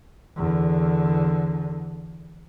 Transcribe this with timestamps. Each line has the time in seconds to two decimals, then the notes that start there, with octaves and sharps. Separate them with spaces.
0.37 E2 D3